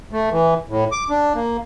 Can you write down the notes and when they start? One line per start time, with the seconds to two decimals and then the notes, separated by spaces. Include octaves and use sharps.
0.12 A3
0.31 E3
0.69 A2
0.92 D6
1.10 D4
1.35 A#3